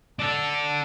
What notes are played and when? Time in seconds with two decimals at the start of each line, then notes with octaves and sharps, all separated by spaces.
0.19 D4 A4